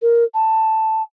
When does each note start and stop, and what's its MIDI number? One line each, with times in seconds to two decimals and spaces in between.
0.02 0.24 70
0.34 1.02 81